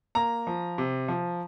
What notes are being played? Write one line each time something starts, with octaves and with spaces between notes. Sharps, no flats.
A#3 A#5
F3
C3
F3